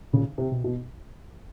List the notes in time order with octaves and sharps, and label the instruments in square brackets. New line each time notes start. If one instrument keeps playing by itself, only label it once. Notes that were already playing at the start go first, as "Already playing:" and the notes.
[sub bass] A#2 [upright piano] C#3
[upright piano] C3
[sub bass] B2
[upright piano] B2